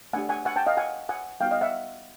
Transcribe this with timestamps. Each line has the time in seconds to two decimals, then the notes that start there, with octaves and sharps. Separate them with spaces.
0.13 A3 D4 G4 F#5 G#5
0.29 F#5 G#5
0.45 F#5 G#5
0.56 G5 A5
0.67 D#5 F5
0.77 F#5 G#5
1.09 F#5 G#5
1.40 G3 B3 D#4 F#4 F5 G5
1.51 D#5 F5
1.61 E5 F#5